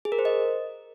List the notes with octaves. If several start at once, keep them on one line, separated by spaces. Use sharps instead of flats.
G#4
A#4
C5
D#5